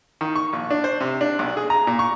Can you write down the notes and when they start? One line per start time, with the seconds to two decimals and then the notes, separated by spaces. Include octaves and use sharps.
0.21 D#3
0.36 C#6
0.53 A#1
0.71 D4
0.84 C5
1.00 C3
1.21 D4
1.39 B1
1.57 G#4
1.70 A#5
1.87 A#2
1.99 C#6